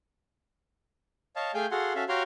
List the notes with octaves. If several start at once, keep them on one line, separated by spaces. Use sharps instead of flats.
C#5 D#5 F5 A5
A3 G#4 F5 G5 G#5 G6
F#4 G#4 A4 F5 F#5 C6
C#4 F#4 A4 E5 F5
F#4 G4 C#5 F5 A#5 C6